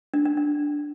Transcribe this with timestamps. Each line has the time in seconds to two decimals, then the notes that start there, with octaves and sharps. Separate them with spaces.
0.14 D4
0.25 D4
0.37 D4